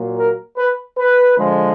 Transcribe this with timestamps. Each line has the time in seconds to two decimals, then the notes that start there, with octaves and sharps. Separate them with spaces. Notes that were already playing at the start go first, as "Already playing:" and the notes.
Already playing: A#2 F#3 A#3
0.18 A#4
0.58 B4
0.98 B4
1.38 D3 F3 G#3